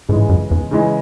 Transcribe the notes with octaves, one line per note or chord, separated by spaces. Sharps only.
G#2 C#3 E3 G#3
F#2
E2
C#3 E3 G#3